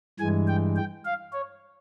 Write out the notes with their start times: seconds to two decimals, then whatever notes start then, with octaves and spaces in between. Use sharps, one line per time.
0.19 G2 E3 G#3 G#5
0.48 G5
0.76 G5
1.05 F5
1.32 C#5